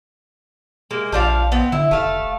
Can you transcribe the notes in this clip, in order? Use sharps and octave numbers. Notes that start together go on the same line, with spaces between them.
G#3 A#3
A#1 F3 D4 F5
B3 C4
D3 E4
F1 A3 F5